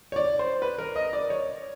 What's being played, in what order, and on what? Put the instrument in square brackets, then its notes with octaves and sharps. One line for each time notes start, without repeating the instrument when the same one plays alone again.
[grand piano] C#5
D5
C5
B4
A#4
D#5
D5
C#5